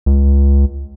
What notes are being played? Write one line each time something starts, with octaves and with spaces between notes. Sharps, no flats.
C#2